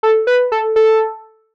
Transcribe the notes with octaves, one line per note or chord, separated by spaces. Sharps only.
A4
B4
A4
A4